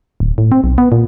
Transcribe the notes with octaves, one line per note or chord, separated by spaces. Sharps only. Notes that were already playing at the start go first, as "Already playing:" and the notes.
D1
A2
C4
B1
B3
A#2